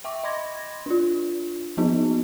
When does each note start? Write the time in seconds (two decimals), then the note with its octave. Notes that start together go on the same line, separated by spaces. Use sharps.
0.04 E5 G5 C#6 D6
0.23 D#5 B5 C6 D6 G#6 A#6
0.86 D4 F4
1.77 F3 A#3 B3 D#4 F#4